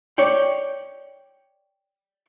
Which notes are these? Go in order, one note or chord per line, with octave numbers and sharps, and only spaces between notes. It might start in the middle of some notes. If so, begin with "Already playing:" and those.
C#5 D5 G5